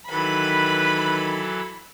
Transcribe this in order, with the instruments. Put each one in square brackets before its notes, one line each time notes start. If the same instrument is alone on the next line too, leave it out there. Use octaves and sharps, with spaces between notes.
[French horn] D#3 [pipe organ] E3 F#3 A4 [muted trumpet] B4 [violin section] B5